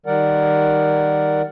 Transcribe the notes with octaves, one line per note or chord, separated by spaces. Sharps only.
D#3 G3 A#4 D5 F#5